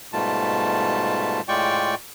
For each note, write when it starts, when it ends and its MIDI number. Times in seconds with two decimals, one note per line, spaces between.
0.13 1.41 44
0.13 1.41 47
0.13 1.41 55
0.13 1.41 57
0.13 1.41 65
0.13 1.41 81
1.48 1.95 45
1.48 1.95 56
1.48 1.95 65
1.48 1.95 74
1.48 1.95 79
1.48 1.95 85